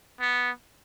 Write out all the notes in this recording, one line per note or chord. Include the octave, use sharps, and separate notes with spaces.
B3